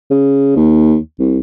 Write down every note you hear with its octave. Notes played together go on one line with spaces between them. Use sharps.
C#3
D#2
C2